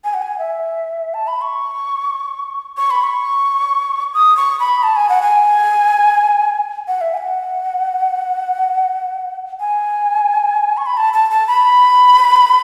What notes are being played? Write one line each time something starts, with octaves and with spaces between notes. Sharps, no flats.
G#5
F#5
G#5
E5
A5
B5
C#6
C#6
B5
C#6
D#6
C#6
B5
A5
G#5
F#5
G#5
F#5
E5
G#5
F#5
G#5
C#6
B5
A5
A5
A5
B5